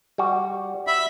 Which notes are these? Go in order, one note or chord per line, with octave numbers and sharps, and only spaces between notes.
G3 F#4
E5 B5